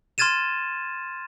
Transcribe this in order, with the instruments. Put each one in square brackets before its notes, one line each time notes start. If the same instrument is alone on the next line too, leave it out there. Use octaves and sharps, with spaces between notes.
[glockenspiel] C6 F6 G#6 A6 D#7 E7